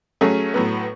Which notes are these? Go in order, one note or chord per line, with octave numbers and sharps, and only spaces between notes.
F#3 A3 C#4 G#4
A2 F#3 B3